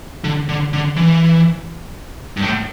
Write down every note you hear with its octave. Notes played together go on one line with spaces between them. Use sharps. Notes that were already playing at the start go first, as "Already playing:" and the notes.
D3
D3
D3
E3
G2
A2